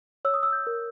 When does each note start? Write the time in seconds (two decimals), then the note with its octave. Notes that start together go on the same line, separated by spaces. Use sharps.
0.25 C#5 E6
0.34 D#6
0.43 E6
0.53 G6
0.67 A#4